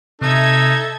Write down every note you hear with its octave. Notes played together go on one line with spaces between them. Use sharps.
C3 D#4 A4 E5 G#6